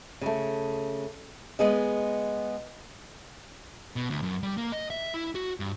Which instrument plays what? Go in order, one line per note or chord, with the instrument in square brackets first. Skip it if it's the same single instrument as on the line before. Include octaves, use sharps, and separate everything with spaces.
[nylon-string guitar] C#3 A3
G#3 B3 G#4 D#5
[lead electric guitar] B2
D2
F#2
G3
A#3
D#5
E5
E4
F#4
G2